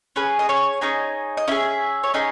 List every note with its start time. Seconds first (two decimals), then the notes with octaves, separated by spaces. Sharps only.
0.16 C#4 G#4 B4
0.39 D#5
0.49 C#4 C#5
0.81 C#4 D#4 G#4 D#5
1.37 D#5
1.48 C#4 E4 G#4 E5
2.03 C#5
2.14 C#4 D#4 G#4 D#5